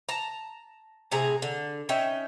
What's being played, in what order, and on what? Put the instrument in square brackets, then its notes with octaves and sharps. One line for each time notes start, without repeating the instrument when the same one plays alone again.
[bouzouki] A5 A#5
A2 C3 G#4 A#5
D3
C#4 D#4 E5 G5